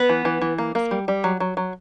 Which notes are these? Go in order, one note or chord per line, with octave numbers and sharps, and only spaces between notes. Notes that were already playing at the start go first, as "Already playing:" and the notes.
Already playing: B3 B4
E3
E3
E3
A#3
A#3
G3
G3
F#3
F#3
F#3